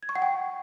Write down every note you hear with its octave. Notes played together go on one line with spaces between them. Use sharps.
G#6
C#6
F#5
G5